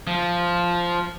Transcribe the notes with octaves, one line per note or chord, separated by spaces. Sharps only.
F3